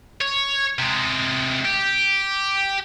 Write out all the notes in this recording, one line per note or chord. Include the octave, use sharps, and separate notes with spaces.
C#5
C3 G#3
G4